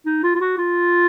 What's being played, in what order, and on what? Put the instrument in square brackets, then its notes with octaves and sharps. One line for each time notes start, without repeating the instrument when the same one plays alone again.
[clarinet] D#4
F4
F4
F#4
F4